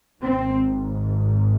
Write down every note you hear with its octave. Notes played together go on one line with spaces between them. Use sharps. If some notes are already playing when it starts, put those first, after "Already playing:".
G#1 G#2 C4